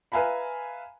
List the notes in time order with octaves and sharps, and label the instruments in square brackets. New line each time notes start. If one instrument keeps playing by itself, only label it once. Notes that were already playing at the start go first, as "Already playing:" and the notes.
[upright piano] B4 E5 F5 G#5 A#5 B5